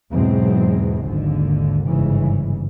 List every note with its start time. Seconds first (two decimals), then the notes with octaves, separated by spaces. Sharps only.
0.10 E2 G#2 B2 F#3 G#3 C4
1.03 G#1 D#2 D3
1.85 G1 G#2 C#3 E3